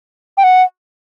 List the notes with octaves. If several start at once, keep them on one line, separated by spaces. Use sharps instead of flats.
G5
F#5